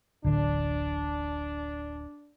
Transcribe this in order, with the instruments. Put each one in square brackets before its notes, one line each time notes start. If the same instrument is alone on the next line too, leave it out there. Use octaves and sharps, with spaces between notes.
[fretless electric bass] D1 A1 D3 [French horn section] D4